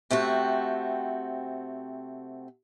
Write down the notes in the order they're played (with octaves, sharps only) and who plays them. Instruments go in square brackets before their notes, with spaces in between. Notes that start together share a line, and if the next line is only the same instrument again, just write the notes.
[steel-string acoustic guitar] C3 A3 C4 F#4